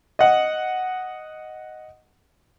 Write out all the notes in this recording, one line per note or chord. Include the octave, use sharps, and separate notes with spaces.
D#5 F#5